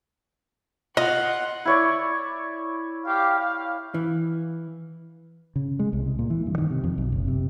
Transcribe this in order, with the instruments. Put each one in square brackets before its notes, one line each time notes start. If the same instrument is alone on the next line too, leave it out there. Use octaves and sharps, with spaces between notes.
[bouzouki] F4 [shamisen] D#5 [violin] F#5
[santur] E4 C#5 D5
[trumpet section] G4 F5
F5
[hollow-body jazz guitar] E3
[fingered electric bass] C#3
G#3
C2
A#2
E3
G2
D#3
C3
F2
B1
F#1
C3